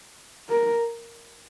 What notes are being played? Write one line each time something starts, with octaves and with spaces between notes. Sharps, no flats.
A#4